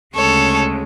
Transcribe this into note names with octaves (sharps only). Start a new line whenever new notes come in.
D2 C#3 G#3 A4 C#5